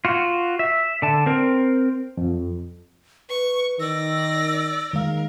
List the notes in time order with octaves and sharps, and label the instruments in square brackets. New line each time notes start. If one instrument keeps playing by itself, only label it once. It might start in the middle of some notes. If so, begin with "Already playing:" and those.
[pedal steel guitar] F4 F#4
E5
D3 A5
C4 A#4
[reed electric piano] F2
[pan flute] B4 [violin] C#6
[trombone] D#3 [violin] D5 A#6 [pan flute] E6
[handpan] D#3 G#3 F5 [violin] A#4